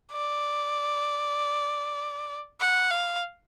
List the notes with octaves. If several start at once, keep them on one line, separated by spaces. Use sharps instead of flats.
D5
F#5
F5